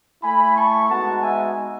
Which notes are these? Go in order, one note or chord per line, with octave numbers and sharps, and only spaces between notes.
A3 E4 G#5 B5
A5 C#6
G#3 B3 D#4 F#4 F#5 A5
E5 G#5